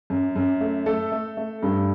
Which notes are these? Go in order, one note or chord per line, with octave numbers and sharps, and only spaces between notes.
F#2
F#2
A3
A3 A4
A3
A3
G2 A4